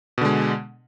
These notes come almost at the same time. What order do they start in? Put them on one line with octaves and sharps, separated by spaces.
B2 D3 G#3